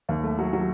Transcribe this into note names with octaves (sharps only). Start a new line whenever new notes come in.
D#2
A3
F#3
F#3